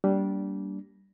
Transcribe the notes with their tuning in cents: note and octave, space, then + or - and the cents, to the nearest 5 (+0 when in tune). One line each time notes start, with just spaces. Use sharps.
G3 -15 A#3 +0 D4 -25